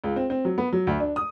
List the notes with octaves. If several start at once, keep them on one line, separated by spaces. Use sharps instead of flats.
C#2
C4
C4
F#3
B3
F#3
D2
D4
D#6